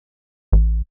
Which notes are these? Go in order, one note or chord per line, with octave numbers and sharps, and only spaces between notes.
A1